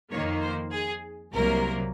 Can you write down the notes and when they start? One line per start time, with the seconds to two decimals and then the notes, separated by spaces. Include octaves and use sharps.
0.11 F2 D#3 A#3 C#5
0.42 C5
0.71 G#4
1.33 C2 C3 F#3 A#3 A#4